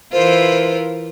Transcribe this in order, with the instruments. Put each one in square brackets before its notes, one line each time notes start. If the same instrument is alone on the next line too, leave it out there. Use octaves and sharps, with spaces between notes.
[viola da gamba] E3 E4 F4 [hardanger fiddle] A#4 [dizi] C5